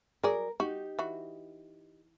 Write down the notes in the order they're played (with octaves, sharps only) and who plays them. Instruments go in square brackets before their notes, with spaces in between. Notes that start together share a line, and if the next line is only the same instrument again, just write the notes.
[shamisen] F#3 G#4 D5 [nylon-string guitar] A#4
[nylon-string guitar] D#4 G4 [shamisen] F#4
[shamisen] E3 F#4